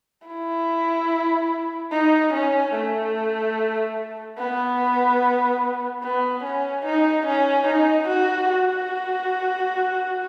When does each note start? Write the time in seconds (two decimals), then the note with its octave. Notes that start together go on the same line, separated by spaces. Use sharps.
0.28 E4
1.92 D#4
2.34 C#4
2.74 A3
4.39 B3
6.03 B3
6.44 C#4
6.85 D#4
7.26 C#4
7.67 D#4
8.08 F#4
8.49 F#4